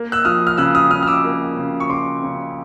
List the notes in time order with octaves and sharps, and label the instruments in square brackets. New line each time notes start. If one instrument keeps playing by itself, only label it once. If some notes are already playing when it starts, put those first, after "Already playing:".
Already playing: [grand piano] A#3
E6 F#6
F3 D#6 F6
F6
C#3 E6 F#6
D#6 F6
C#3 D#6 F6
F6
D6 E6
A#3
C#3
C#6
C#3 C6 D6
C#3